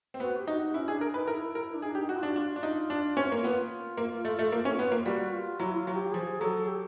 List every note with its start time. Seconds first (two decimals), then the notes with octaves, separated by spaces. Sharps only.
0.14 C4
0.20 B3 F#4
0.39 G4
0.47 D#4 F#4
0.74 C#4 E4
0.88 D4 G#4
1.01 A#4
1.14 D#4 B4
1.27 E4 A#4
1.55 A#4
1.75 D4
1.82 D#4 G#4
1.91 D4
1.95 G4
2.00 D#4
2.09 F#4
2.18 F4
2.23 D4
2.27 F#4
2.36 D4 F4
2.56 D4
2.63 D#4
2.90 D4
3.17 C#4
3.32 A#3
3.44 B3 F4
3.97 A#3
4.25 A3
4.39 A3
4.52 A#3
4.65 C#4
4.79 B3
4.92 A#3
5.06 G3 F#4
5.33 F4
5.59 F#3 E4
5.77 F4
5.87 F#3
5.95 G4
6.13 F3 G#4
6.41 F#3 A4
6.68 G4